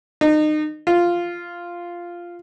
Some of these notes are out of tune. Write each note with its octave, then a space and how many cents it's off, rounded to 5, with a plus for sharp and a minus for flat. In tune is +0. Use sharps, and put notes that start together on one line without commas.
D#4 -30
F4 -5